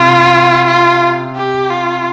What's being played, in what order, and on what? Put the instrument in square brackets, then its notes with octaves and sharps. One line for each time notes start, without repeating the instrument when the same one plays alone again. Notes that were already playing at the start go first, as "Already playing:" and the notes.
Already playing: [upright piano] C3 [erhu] F4
[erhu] F4
G4
F4